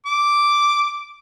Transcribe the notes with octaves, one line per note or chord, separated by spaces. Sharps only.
D6